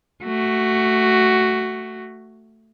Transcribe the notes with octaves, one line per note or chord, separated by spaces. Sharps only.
A3 F#4